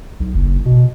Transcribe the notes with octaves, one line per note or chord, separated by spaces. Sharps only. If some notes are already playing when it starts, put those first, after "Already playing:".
B1
F#1
B2